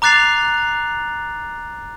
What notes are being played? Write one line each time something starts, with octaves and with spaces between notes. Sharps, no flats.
A#5 D6 F#6 A6 C7 F7